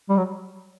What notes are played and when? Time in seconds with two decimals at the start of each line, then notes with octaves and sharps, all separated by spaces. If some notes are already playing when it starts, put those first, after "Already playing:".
0.09 G3
0.17 F#3